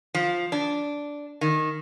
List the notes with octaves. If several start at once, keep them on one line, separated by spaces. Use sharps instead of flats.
F3
D4
D#3